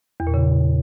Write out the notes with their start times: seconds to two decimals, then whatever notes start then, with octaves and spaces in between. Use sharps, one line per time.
0.20 E2
0.27 A#2
0.34 C#3